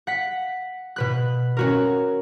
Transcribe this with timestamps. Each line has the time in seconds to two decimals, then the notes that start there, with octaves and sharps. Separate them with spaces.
0.07 F#5 B6
0.96 B2 B4 F#6
1.57 C#4 F#4 A#4